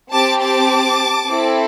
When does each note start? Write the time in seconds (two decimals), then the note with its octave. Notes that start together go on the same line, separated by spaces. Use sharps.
0.12 C4 G4 A5 D6
0.41 A5 D6
1.30 C4 E4 A4